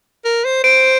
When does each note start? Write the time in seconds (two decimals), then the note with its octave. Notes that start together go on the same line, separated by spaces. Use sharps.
0.25 A#4
0.45 C5
0.64 C5 D7